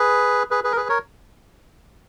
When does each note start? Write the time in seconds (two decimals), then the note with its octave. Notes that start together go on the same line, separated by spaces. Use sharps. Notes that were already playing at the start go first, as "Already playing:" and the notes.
Already playing: G#4 B4
0.51 G#4 B4
0.64 G#4 B4
0.72 A#4
0.77 G#4 B4
0.89 A#4 C#5